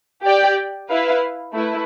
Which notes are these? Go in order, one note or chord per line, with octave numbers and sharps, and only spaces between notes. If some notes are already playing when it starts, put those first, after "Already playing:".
G4 D5 G5
E4 B4 F5
A3 E4 B4